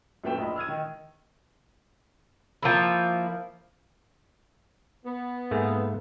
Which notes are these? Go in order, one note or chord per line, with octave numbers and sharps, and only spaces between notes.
F#2 A#2 A3 B4 G5 E7
A#1 D#4 B5
E6 F6 G#6 D#7
D#3
F3 A#3 E4
B3
G#2 A3 A#3